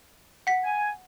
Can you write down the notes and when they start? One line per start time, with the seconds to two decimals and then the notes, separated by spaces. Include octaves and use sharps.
0.47 F#5 B6
0.64 G#5